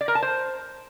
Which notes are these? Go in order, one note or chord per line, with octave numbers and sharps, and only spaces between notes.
D5
A#4
A5
C5